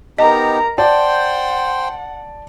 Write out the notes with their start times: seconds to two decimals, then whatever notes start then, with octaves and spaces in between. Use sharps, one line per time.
0.18 B3 D#4 G4 A#4 D#5 A#5
0.78 C5 D5 F#5 G5 A5 C6